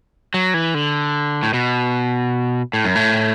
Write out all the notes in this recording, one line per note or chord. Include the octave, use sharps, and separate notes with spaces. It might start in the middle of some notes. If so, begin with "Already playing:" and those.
F#3
E3
D3
A2
B2
A2
F#2
A2